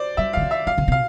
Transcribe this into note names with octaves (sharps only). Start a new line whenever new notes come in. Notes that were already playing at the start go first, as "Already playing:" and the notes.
Already playing: C5 D5
G3 E5
D3 F5
E3
E5
E3 F5
D3
C3 F5